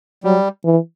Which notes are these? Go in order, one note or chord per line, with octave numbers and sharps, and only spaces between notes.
F#3 G3
E3